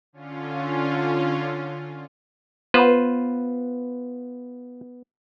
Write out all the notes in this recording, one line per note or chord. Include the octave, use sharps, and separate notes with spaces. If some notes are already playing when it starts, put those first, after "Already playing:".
D3 C#4 F4
B3 F4 B4 C5